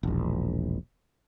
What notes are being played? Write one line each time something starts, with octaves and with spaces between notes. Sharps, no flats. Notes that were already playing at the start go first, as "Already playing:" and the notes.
E1 A#1